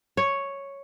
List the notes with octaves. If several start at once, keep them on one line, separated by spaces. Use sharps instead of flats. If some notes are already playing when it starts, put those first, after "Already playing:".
C#5